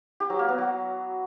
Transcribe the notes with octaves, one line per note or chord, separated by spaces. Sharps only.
G4
F#3
A#3
B3
F#3